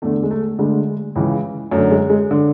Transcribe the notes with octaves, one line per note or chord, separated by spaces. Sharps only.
E2 D3 A3
G#3
A3
D2 D3 G#3
C#2 C#3 E3
F#2 D3 A3
G#3
G#3
D3